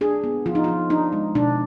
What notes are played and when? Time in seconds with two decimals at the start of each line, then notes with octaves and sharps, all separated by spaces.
0.01 D4 G#4
0.24 B3
0.46 F3 F4
0.55 D#4
0.64 F3 F4
0.90 D4 D#4
1.13 G#3
1.35 B2 D4